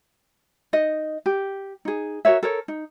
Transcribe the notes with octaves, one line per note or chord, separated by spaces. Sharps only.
D#4 D#5
G4
D#4 G#4
F#4 A#4 C#5 E5
A4 A#4 C#5
D#4